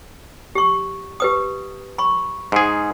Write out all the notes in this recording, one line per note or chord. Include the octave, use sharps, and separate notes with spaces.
G4 C#6
G4 B4 D#6
B5 C#6
G#2 G#4